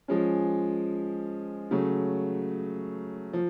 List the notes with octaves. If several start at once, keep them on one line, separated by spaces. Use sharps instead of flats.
F3 G#3 C#4
C#3 F#3 A3
F3